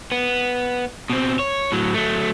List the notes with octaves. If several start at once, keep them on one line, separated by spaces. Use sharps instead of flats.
B3
B2 C4
C#5
A2 F#3
F#3 A3